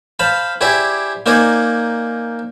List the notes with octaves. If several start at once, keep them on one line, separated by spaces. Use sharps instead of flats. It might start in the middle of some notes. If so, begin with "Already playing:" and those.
C5 F5 A5 B5
E4 G4 G#4 C5 D5
A#3 D#4 C5 D5 G#5